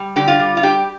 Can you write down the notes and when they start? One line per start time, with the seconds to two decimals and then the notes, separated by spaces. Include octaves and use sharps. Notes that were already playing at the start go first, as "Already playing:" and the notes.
Already playing: G3
0.16 D3 G4
0.28 F4
0.40 G3
0.57 F4
0.63 G3 G4